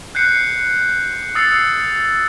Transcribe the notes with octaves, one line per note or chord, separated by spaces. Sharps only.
F#6 G6 C7 C#7
D#6 E6 A6 C7 C#7